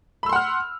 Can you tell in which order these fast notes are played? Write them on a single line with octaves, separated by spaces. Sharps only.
B5 E6 C6 F#5 F6